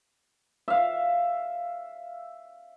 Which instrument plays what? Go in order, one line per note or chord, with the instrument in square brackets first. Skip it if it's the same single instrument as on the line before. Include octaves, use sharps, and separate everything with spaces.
[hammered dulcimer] E5 F5